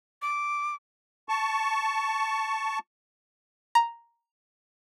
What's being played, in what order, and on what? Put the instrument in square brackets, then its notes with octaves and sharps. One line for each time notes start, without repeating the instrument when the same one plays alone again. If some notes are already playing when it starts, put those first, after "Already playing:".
[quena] D6
[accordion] A5 C#6
[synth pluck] A#5